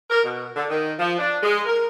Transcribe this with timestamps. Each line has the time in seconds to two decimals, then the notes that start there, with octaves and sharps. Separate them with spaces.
0.10 A#4
0.24 B2
0.56 D3
0.69 D#3
0.99 F3
1.19 D4
1.43 G#3
1.65 A#4